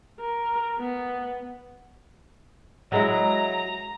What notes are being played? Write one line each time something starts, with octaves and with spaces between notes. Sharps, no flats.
A#4
B3
F#3 G#3 E4 A#5